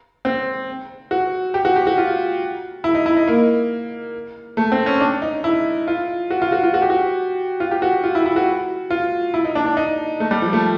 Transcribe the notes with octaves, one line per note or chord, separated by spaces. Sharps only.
C4
F#4
G4
F#4
G4
F#4
F4
E4
D#4
E4
D#4
A#3
A3
C4
C#4
D4
D#4
E4
F4
F#4
F4
F#4
F4
F#4
G4
F#4
F4
G4
F#4
F4
E4
E4
F#4
F4
E4
D#4
D4
D4
D#4
A3
G3
F3
A3